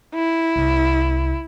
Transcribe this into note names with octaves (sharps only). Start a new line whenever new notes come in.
E4
C2